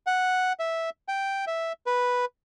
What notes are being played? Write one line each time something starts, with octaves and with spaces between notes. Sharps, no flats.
F#5
E5
G5
E5
B4